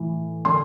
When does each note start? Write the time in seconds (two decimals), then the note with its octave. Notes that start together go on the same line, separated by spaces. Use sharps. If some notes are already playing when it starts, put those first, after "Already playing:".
Already playing: A2 E3
0.45 D3 C6